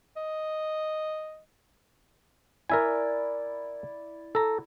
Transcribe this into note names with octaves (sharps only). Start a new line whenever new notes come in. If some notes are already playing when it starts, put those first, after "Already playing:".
D#5
E4 A#4 D5 E5 G#5
A4 A#5